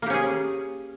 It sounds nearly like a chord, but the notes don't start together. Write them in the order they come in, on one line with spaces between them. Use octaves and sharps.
A#3 G4 C#4 G#4